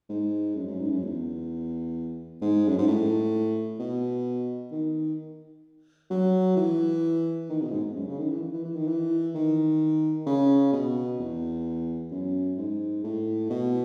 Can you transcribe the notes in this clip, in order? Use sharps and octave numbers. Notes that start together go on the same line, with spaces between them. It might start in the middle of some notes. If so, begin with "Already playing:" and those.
G#2
F#2
F#2
G#2
F#2
E2
G#2
F#2
G#2
A2
B2
D#3
F#3
E3
D#3
B2
G#2
F#2
C#3
D#3
E3
E3
E3
D#3
E3
D#3
C#3
B2
E2
F#2
G#2
A2
B2